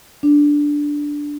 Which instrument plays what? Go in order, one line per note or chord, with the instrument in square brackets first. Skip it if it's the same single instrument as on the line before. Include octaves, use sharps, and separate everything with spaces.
[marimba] D4